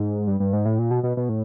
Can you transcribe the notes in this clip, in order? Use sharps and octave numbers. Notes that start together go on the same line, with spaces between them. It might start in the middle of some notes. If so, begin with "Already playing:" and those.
Already playing: G#2
G2
G2
G#2
A2
A#2
B2
B2
B2
A2